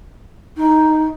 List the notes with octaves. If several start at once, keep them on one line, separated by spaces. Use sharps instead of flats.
D#4